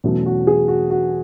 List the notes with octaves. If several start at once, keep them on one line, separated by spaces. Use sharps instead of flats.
E2 B2 F#3 A3 C#4
F#4
G#4
F#4
F#4